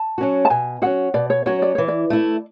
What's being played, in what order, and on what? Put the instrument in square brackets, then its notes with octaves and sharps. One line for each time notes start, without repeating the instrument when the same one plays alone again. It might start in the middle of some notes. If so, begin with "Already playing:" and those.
Already playing: [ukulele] A5
[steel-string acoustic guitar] F#3 C#4 F#4
[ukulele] A5
[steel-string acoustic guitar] B2 [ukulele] G#5
[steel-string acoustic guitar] F#3 C#4 F#4 [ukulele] F#5
[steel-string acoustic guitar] B2 [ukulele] D5
[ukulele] C#5
[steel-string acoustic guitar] F#3 C#4 F#4 [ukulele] C#5
[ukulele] D5
[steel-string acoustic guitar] E3 [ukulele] C#5
[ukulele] D5
[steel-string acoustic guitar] A3 E4